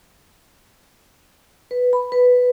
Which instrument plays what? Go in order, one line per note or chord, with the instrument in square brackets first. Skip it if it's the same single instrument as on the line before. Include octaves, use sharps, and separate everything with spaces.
[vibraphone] B4
B5
B4